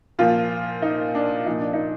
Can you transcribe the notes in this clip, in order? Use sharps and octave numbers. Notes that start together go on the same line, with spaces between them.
A#2 F3 F4
D#4
D4
A#2 F3 D#4
D4
D#4